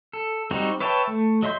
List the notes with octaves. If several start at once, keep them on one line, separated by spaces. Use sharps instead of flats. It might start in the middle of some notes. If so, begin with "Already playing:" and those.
A4
G3 C4 D#4 F#4
B4 C#5 E5 G5 A5
A3
F#3 D#5 E5 C6 G6